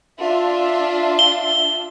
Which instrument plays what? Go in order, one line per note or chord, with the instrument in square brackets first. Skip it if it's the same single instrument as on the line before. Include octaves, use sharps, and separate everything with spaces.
[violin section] D4 F4 E5
[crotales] G7